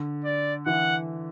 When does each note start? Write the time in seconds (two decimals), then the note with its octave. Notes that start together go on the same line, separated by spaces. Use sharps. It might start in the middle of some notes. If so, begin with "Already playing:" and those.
Already playing: D3
0.24 D5
0.66 E3 F#5